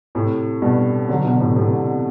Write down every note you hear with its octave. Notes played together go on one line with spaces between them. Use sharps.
A2 C3
G2 B2
D3 F#3
B2 D3
A2 C3
A2 C3